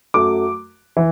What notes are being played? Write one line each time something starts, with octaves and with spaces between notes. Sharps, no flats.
F#2 F#3 A3 D6
E3